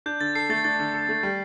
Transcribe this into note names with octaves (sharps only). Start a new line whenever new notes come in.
D4 G6
D3 A6
A4 C7
A3 A6
D4 A6
D3
A4
A3
G3